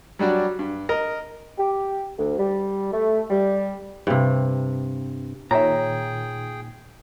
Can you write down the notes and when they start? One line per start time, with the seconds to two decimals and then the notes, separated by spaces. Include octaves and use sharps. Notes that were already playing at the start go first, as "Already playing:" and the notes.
0.19 F#3 G3 D4 F#4
0.59 G2
0.89 A#4 D#5 A#5
1.58 G4
2.18 D2
2.39 G3
2.93 A3
3.30 G3
4.07 G2 C3
5.51 A#2 D#3 G#4 C#5 E5 G5 A#5